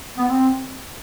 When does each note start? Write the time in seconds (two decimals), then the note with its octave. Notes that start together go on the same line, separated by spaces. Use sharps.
0.17 B3
0.28 C4